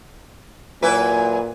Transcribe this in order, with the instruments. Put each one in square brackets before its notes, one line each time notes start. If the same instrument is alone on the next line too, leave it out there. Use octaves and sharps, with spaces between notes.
[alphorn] A#2 [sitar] F#3 E4 B4 [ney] G#5